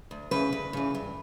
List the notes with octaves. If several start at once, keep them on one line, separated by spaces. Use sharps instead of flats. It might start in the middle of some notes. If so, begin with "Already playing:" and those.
D2
C#3 E3 B4
D2
C#3 E3
G2